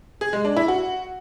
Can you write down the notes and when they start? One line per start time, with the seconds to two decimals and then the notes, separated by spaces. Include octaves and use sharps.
0.21 G#4
0.33 G#3
0.45 D4
0.56 E4
0.68 F#4